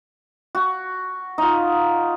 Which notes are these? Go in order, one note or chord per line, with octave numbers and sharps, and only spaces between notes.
F#4
D#4 F4